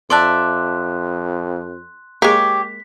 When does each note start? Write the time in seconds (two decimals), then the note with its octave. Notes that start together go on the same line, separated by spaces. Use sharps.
0.10 F2 D5 E5 A5 C6 F#6
2.22 G#3 A#3 G4 C#5 B6